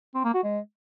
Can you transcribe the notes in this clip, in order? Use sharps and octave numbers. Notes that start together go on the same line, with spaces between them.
C4
A#3
F#4
G#3